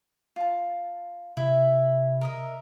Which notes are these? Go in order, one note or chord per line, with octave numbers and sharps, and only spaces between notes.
F4 A5
C3 E4 E5
A#4 D#5 E5